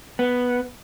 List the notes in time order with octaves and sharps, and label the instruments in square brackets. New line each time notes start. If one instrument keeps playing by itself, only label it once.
[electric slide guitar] B3